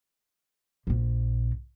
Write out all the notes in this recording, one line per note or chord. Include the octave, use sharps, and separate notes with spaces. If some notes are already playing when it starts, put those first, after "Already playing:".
A#1 A#2